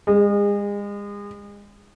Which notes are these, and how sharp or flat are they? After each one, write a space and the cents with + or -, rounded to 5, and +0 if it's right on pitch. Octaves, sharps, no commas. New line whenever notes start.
G#3 -35